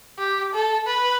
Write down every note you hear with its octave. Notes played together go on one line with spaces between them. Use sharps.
G4
A4
B4